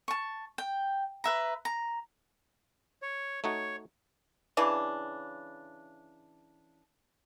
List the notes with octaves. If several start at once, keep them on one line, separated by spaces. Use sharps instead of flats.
A5 C#6
G5
B4 E5 A#5
A#5
C#5
A3 D#4 F#4 C#5
C#3 E3 D4